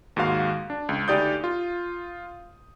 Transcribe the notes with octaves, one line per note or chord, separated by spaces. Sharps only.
D#2 G#2 F#4 F5
D4
C#2
D2 D#4 G4 D5 D#6 G6
F4